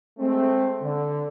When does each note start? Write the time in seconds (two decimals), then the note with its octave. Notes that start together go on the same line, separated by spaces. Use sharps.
0.18 G#3 A3 C4
0.81 D3